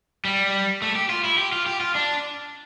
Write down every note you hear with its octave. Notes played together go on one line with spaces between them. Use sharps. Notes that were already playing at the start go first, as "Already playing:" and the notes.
G3
A3
G4
F4
E4
G4
F4
G4
F4
D4